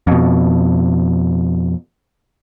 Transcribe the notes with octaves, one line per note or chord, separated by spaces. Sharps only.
F2 B2